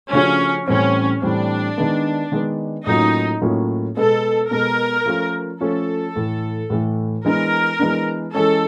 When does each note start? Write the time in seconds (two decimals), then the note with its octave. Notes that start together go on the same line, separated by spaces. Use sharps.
0.12 C#3 F3 A3 C#4 D4 F#4
0.68 A2 E3 G3 C4 C#4
1.22 A2 E3 G3 C4 D4
1.77 D#3 G#3 B3
2.32 D#3 G#3 B3
2.86 A2 F#3 A#3 C#4 D#4 F4
3.41 A2 F#3 A#3 C#4 F4
3.96 B2 G#3 B3 A4
4.51 B2 G#3 B3 A#4
5.06 F3 A3 C#4 F4
5.60 F3 A3 C#4 F4 A4
6.15 A2 E3 A3
6.70 A2 E3 A3
7.25 E3 G#3 B3 D4 A#4
7.79 E3 G#3 B3 D4
8.35 E3 G#3 C#4 A4